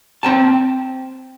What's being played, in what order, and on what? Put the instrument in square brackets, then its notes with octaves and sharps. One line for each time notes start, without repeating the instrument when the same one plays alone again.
[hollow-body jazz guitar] C4 G5 A5